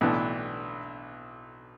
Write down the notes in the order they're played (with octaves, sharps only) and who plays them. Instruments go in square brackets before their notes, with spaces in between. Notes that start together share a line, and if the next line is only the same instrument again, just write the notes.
[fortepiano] B1 A2 E3 B3 D4